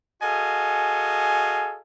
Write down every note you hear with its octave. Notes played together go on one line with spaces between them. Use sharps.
F#4 G#4 A4 D#5 F5 G#5